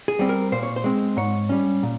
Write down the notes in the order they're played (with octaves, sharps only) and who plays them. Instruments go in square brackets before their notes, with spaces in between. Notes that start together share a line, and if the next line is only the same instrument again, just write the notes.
[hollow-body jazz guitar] G#4
G3 C4
A#4
A#2 C5
C#5
C5
G#3 C4
G#2 C#5
G3 C#4
A#2